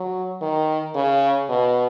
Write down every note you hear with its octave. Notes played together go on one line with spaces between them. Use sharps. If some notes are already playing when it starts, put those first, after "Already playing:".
Already playing: F#3
D#3
C#3
B2